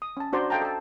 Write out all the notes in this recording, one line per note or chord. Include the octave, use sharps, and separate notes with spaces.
D#6
C#4 A5
D4 F#4 C5 D5 A#5 C6
A4 D#5 F5 G5 A5 A#5
A4 A5